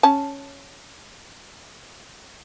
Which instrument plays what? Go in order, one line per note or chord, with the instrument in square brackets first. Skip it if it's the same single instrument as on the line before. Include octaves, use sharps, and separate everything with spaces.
[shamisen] C#4 A5